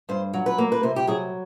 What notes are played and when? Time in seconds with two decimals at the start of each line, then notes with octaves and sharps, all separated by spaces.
0.09 G2 C5
0.33 F#3
0.46 B4
0.58 A#3
0.72 B4
0.83 C3 C5
0.96 G4
1.07 F#3 G#4